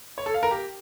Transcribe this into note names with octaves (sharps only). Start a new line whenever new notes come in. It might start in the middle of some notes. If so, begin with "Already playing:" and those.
C#5
A4
F5
A#4
G4